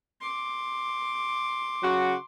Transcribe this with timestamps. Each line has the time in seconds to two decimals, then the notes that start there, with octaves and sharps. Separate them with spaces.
0.21 C6 D6
1.83 C#3 F#3 F#4